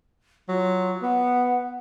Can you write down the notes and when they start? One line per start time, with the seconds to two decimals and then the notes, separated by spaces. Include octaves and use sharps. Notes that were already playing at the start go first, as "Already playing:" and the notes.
0.48 F#3 F4
1.02 B3 F#5